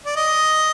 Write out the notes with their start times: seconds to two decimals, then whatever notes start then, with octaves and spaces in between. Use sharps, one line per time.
0.06 D5
0.16 D#5